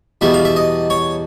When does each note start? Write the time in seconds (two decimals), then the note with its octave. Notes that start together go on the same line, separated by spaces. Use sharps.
0.21 E2 B2 G3 E5
0.34 F5
0.45 E5
0.56 D#5
0.90 C#5